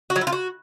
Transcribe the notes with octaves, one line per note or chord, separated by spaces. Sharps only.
F#4
F#3
E4
F4
F#4